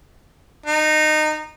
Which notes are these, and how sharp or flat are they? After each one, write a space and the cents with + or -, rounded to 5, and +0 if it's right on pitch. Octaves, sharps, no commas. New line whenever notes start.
D#4 -20